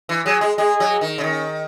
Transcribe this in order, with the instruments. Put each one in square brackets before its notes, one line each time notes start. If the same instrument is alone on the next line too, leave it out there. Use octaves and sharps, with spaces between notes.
[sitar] E3
[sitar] F#3 [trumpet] G#4
[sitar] G#3
[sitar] G#3 [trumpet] G#4
[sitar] F#3
D#3
C#3
[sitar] D#3 [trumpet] C#4